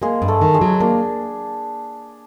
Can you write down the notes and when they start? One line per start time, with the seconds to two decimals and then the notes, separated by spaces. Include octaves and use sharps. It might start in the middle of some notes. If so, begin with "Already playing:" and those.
0.02 G#3 A#3 G#4
0.22 G2
0.28 A3 A4
0.41 D#3
0.54 G#3 G#4
0.61 F#3
0.80 A#3 D4